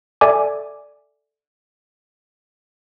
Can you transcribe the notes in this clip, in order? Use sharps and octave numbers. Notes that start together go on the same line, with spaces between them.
A4 D5 E5 G#5 D6